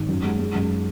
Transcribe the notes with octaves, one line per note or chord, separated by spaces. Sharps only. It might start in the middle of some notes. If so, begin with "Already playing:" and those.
Already playing: G#1
F#2
G#3
G#3
F#2